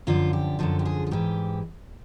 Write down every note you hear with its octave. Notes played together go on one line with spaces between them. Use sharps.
F#2 D3 F3 F4
G4
F#2 D3 F3 A4
G4
G#4
G#4
G#2 E3 G4